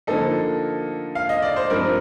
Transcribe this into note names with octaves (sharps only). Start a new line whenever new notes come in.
D3 F3 A#3 D#4 A4
F5
D#5
D5
C5
G2 F3 C4 A#4